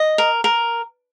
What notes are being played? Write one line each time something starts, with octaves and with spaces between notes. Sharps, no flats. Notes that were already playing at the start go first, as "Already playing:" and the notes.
Already playing: D#5
A#4
A#4